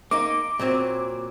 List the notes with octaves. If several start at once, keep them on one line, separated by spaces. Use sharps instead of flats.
A#3 D#4 D6
A#2 F#3 C4